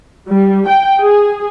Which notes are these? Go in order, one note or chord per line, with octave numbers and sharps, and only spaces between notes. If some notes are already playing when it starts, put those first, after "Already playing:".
G3
G5
G#4